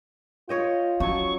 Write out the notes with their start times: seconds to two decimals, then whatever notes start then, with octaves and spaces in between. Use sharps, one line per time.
0.49 F4 C#5 D#5 G5
1.00 F3 F#3 C#4 C#6